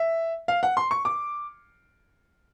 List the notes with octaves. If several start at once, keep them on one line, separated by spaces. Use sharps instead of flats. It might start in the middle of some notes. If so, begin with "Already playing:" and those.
Already playing: E5
F5
F#5
C6
C#6
D6